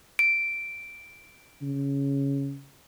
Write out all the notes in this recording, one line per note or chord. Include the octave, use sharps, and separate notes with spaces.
D7
C#3